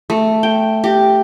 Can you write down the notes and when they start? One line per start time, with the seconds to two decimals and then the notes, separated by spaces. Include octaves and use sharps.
0.10 A3
0.43 G5
0.84 G4